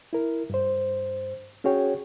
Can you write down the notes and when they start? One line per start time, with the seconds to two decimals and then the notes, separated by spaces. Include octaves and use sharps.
0.13 E4 A#4
0.50 G2 C5
1.64 C#4 F#4 G#4 C#5 G5